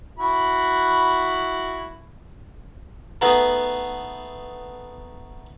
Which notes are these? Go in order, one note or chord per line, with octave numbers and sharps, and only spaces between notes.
E4 F#4 B5
A3 B3 D#4 G#4 B4